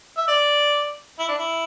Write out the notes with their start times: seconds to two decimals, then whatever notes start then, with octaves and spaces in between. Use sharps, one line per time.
0.17 E5
0.28 D5
1.19 E4
1.28 D4
1.38 E4